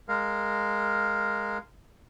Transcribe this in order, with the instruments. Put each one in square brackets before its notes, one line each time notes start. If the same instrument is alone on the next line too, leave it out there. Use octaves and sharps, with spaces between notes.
[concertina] G#3 A#4 F5